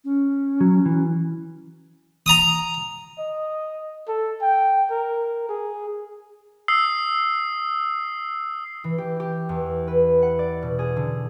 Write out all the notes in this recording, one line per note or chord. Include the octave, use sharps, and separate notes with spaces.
C#4
F#3
E3
A#5 D#6
D#5
A4
G5
A#4
G#4
D#6 E6 C7
E3
G4
G4
E2
B4
F#5
D5
B2
G#4
D3